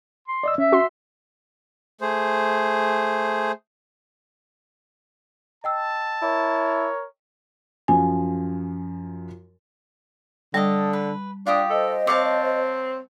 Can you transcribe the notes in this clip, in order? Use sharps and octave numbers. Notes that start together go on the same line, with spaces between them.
C6
D5 D#5 E6
C#4 E5
F#4 C6
A3 G#4 C5
D#5 G5 A5 E6
E4 A#4 C#5
F#2 F3 G#5
D3 G3 D#5 A5
B4
D4 F4 G4 D#6
A4 C5 D#5
C4 C#5 F5 A5 D6